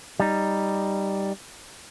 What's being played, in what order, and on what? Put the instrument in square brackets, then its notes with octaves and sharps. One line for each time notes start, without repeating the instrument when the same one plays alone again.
[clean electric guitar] G3 D#4